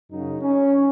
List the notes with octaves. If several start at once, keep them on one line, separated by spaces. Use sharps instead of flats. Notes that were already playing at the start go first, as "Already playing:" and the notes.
F#2 C#3 F#3 D#4
C#4